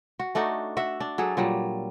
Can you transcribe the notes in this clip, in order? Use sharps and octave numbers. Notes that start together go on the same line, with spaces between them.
F#4
A3 D4 D#4 F#4
F#4 E5
D4
F#3 G#4 A4
A#2 F#3 G3